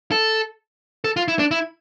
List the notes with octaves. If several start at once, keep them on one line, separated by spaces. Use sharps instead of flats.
A4
A4
F4
E4
D4
E4